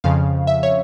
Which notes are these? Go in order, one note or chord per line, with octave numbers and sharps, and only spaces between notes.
F2 C#3 F3 F5
E5
C#5